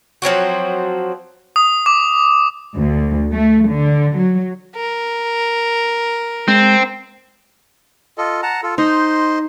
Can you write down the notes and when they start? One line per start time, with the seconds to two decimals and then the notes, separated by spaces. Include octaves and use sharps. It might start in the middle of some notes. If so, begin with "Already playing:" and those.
0.22 F3 F#3 C4 F#4
1.56 D#6
1.86 D6
2.75 D2
3.33 A3
3.69 D3
4.15 F#3
4.76 A#4
6.48 G#3 C4
8.18 F4 A4 D#5
8.43 F#5 A5 A#5
8.63 F4 A4
8.78 D#4 C5 D#5 C6